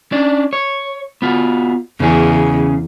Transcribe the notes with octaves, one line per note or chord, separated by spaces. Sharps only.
C#4 D4 D5
C#5
B3 F4 F#4
E2 C#3 C#4 G#4